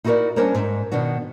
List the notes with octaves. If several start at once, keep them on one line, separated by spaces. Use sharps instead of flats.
D#4 E4 F#4 G#4 A#4 D5
G3 C#4 D4 A#4 C5 C#5
G#2
B2 D#3 B3 D4 F#4